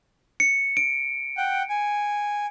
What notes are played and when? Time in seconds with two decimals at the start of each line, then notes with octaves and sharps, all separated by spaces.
0.40 C#7
0.77 D7
1.37 F#5 G5
1.69 G#5